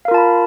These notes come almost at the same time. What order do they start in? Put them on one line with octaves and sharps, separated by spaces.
F5 A#4 F4 A5 B5